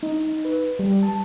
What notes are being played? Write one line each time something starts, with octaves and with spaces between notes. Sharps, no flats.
D#4
B4
G3
A5